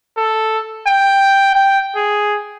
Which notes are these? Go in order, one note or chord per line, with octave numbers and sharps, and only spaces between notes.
A4
G5
G5
G#4